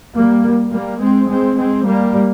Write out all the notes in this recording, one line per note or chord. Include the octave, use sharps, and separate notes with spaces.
G3 A#3
G3 A#3
G#3 C4
G#3 C4
G#3 C4
G3 A#3